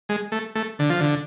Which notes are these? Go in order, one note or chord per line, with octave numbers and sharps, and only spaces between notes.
G#3
A3
A3
D3
F3
D3